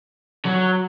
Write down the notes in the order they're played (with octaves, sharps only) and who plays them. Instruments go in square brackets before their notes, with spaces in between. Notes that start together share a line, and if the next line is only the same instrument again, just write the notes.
[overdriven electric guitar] F#3